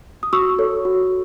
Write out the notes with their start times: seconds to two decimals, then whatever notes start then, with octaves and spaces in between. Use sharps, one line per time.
0.23 D#6
0.33 F#4 C#6 E6
0.59 A4 C#5
0.85 F#4